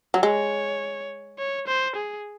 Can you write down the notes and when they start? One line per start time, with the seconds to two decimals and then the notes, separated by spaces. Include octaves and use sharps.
0.14 F#3
0.23 G#3 C#5
1.39 C#5
1.67 C5
1.96 G#4